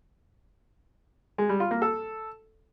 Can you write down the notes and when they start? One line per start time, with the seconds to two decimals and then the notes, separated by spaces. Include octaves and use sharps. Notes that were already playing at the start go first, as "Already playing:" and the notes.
1.38 G#3
1.49 G3
1.60 F4
1.71 A#3
1.82 A4